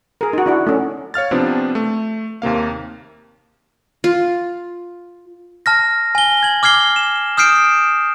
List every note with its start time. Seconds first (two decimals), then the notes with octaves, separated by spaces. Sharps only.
0.21 G#4 A#4
0.33 D#4 F#4
0.46 D4 E4 F#4
0.67 A3 C#4
1.14 C#5 F5 F6 A6
1.31 C3 F3 B3 C4 D4
1.75 A3
2.42 D#2 C3 A#3 F5
4.04 F4
5.66 A5 F6 A#6
6.15 G#5 G7
6.43 G#6 F#7
6.63 D6 F6 G#6 C7 G7
6.96 E7
7.37 D#6 F6 G6 C7 D7 E7